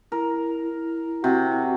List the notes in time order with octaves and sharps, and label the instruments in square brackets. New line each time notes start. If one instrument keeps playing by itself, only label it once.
[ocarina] E4 [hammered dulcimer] A#4
[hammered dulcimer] C3 [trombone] F#4